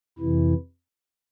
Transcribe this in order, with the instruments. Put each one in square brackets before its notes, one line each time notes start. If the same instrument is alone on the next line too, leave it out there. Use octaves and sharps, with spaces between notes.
[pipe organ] F2 C3 E3 E4